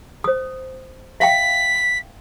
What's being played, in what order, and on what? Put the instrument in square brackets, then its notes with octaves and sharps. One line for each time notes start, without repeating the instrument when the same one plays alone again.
[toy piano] C5 D#6
[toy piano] E5 F5 G5 [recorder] B6